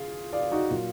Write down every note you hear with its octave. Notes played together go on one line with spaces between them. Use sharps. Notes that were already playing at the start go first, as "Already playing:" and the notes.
Already playing: F4 G#4
D5 F5
D#4 F#4
A#2 F#3 A#3 F4